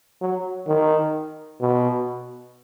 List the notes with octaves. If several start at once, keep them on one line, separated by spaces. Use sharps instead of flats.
F#3
D#3
B2